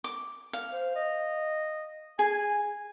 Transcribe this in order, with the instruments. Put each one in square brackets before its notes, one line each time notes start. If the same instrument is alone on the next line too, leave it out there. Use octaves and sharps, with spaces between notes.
[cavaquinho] D6
F5
[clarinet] C5
D#5
[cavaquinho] G#4 [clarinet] G#5